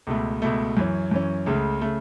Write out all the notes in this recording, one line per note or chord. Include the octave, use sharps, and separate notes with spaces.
C#2 B2 A3
C#2 B2 A3
F#2 E3 C#4
F#2 E3 C#4
C#2 C#3 A3
C#3 A3